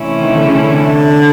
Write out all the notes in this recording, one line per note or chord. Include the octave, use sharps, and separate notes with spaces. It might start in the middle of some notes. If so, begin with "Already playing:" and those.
Already playing: C3 E3 A3 C#4 E4
D#3
D3
C#3
D3